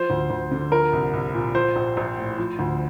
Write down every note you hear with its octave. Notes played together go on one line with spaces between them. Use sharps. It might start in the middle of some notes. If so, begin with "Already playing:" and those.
Already playing: F3 C5
D2
D2
D3
F3 A#4
C2
C2
A#2
F3 C5
A#1
A#1
A2
F3
D2